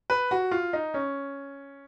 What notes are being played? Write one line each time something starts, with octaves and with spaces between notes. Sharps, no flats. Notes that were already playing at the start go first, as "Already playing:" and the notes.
B4
F#4
F4
D#4
C#4